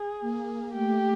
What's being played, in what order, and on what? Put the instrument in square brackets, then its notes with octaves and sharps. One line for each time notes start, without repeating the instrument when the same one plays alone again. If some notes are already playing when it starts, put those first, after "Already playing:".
Already playing: [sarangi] G#4
[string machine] A#3
[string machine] A3 [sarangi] G4